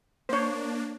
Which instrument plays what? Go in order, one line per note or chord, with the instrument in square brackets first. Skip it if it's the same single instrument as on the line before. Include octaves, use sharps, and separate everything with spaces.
[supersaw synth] A#3 D4 [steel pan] C5 C#5